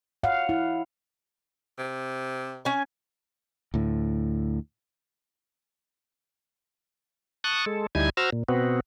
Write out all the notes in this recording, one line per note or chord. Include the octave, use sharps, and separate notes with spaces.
C#5 F5 F#5
E4
C3
C#4 G#5
D2 A2
A5 C#6 D#6 F#6
G#3 A4
D2 G3 D#4 E4 G#5 G#6
F#4 C5 A#5 E6 F6
A#2
B2 B3 C4 F#4